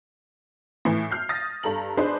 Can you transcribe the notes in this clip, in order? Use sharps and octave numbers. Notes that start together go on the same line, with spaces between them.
A2 E3
F6 G6 C7
D#6 A6 A#6
G2 A4 A#5 F#7
D4 G#4 B4 C5 D#5